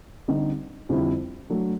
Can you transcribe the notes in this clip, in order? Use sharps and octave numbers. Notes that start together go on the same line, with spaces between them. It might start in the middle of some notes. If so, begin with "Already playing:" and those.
D3 G3 C4 D#4 G4
F2 D3 G3 C4 E4
F#3 A3 D4